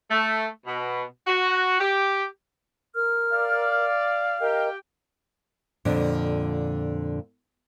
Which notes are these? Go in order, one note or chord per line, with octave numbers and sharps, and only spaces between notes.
A3
B2
F#4
G4
A#4 F6
D5 F5
G4 A#4 D#5 G5
F2 A#2 D3 D4